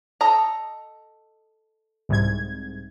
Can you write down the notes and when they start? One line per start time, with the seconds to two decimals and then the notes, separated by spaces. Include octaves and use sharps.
0.21 A4 D#5 A#5
2.09 C2 G#2 G#6